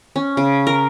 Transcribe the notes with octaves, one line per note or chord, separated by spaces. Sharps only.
C#4
C#3
A#4